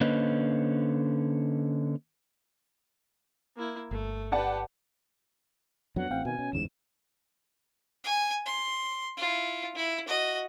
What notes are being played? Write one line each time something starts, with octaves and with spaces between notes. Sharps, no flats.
D3 A#3 C#4 B4 C5 D#5
A#3 E4
G1 A3
G4 B4 D5 F#5 A5
F2 F3 F#3 B3 D4 F#5
A1 C4 F5 G5
B2 D#3 G#5
B2 C#4
G1 E2 G#2 E7
G#5
C6
E4 F4
E4
F#4 D#5